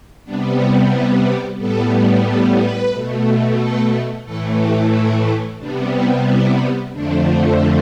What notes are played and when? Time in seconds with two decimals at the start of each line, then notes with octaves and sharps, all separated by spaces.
0.25 C3 G3 B3 D4
0.58 E4
0.92 E4
1.25 G4
1.58 A2 G3 B3 A4
2.25 A4
2.58 B4
2.92 B2 A3
3.59 A4
4.25 A2 E3 A3 A4
4.58 G4
4.92 E4
5.59 C3 G3 B3 D4
5.92 E4
6.26 E4
6.92 F2 D3 F3 A3 D4